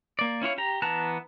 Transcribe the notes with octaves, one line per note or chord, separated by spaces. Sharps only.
A#3 D5
C#4 E4 F4 C#5
G4 A#5
E3 B3 A5 A#5 F#6